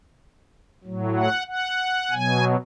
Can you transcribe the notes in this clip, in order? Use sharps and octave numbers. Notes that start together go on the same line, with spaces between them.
A2 F#3
F#5
F#5
B2 F#3 G#5